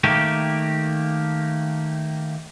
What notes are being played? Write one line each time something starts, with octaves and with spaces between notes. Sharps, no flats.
D#3 A3 A#3 G4